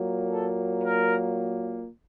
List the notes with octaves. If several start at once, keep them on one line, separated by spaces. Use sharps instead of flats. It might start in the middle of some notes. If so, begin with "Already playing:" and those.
Already playing: A#2 F#3 A#3
A4
A#4